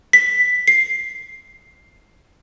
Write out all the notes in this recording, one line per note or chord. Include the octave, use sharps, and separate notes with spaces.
B6
C7